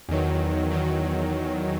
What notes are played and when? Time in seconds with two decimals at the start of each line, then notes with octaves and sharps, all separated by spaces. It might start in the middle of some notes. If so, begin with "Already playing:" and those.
0.09 E2 D#3 F#3
0.71 E2 D#3 F#3